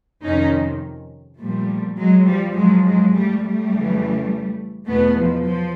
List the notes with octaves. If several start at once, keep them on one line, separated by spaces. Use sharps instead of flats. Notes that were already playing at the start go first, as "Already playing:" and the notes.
F2 C3 D#3 C#4 D#4
A#2 F3 G3 A3
F#3 G#3
F3 G3
G#2 F3 F#3 G#3
F#3 G#3
G3 A3
G3 A3
F2 C#3 E3
E2 B2 A3 B3
F3
F3